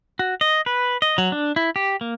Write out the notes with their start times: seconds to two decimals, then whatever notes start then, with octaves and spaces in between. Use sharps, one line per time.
0.19 F#4
0.41 D#5
0.66 B4
1.02 D#5
1.18 F#3
1.32 D4
1.56 E4
1.76 G4
2.01 A#3